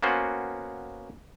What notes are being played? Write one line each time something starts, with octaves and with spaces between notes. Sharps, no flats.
A#3 B3 C#4 F#4 C5